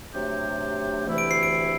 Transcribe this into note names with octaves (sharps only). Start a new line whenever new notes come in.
C3 F#3 A3 D4 G4
D2 C3 E3 A3 E4
D7
C7
D7